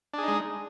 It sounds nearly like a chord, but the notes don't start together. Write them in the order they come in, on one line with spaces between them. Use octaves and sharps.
D4 G#4 D#4 G#3